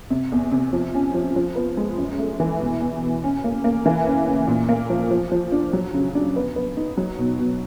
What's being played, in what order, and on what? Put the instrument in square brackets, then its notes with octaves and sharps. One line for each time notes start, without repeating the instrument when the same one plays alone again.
[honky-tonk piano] C3
E2
C3
F3
C#4
F3
F3
B3
G#3
F#2
A3
E3
B2
E2
B2
C#4
A#3
A#3
E3
C#4
C#3
A#2
A#3
F3
F3
F3
D4
F#3
C#3
D4
B3
B3
D#4
F#3
B2
B2